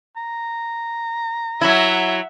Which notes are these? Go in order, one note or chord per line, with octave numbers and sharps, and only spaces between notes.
A#5
F#3 E4 E5 F#5